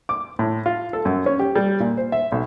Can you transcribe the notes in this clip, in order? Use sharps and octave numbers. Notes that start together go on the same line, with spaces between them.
D6
A2
F4
A4
F#2
C#4
G4
G3
A#2
C5
E5
B1